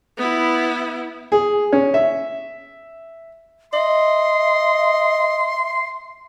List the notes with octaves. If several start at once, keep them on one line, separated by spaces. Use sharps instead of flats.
B3 E4
G#4
C#4
E5
D#5 E5 C6